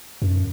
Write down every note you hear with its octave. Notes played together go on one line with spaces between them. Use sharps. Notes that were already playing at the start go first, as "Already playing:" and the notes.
F#2